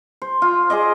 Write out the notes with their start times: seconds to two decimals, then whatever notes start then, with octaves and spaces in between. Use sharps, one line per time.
0.22 C5
0.42 F4
0.70 G#4 D5 D#5